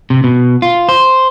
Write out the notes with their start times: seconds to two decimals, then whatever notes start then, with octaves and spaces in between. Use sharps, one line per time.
0.10 C3
0.24 B2
0.62 F4
0.89 C5